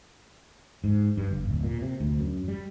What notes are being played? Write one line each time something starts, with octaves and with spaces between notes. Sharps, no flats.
G#2
G2
F#1
D1
A#2
C3
D2
F#2
G3